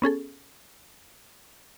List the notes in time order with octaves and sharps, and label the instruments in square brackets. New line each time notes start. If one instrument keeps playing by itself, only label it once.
[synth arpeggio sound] B3 C#4 G#4 A4